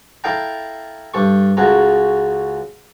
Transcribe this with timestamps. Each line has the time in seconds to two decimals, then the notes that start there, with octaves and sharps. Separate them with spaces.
0.24 E4 A4 E5 F5 G5 A#5
1.14 G2 A4 C#6
1.57 C#2 C#3 F#4 A4 A#5